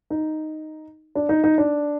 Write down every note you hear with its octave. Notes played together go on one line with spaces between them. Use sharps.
D#4
D4
D#4
D#4
D4